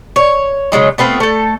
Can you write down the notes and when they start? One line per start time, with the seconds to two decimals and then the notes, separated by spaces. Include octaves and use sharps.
0.16 C#5
0.72 C#3 F#3 G#3 D#4
0.98 A3 B3 C4 F4
1.20 A3 A4